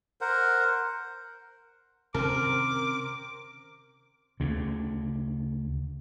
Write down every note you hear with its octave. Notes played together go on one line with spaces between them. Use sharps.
A#4 C5 F#5
C3 D#3 C4 C#4 A#4 D6
D2 C#3